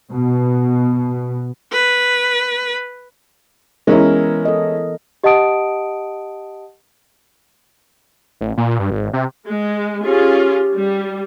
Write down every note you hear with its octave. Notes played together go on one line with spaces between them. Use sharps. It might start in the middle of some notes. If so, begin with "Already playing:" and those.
B2
B4
E3 G#3 B3 C#4 E4 A#4
A4 D#5
G4 D#5 F#5 A5 D#6 D7
A1
A#2
G2
G#1
C3
G#3
C#4 F4 G4 G#4
G3